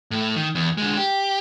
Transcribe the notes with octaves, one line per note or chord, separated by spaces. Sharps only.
A2 A3
D#3
E2
D3 G#3
G4